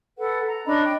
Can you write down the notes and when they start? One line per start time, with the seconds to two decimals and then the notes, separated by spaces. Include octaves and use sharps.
0.18 A4 B4 F#5
0.47 A#5
0.65 C#4 D4 D#5 B5
0.84 G5